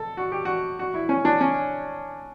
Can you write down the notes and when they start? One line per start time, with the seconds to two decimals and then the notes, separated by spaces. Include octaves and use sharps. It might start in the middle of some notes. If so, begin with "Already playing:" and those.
Already playing: A4
0.17 F#4
0.32 G4
0.45 F#4
0.79 F#4
0.94 E4
1.09 C#4
1.25 D4
1.41 C#4